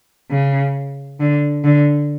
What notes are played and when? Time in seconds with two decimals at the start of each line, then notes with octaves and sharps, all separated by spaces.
0.31 C#3
1.20 D3
1.64 D3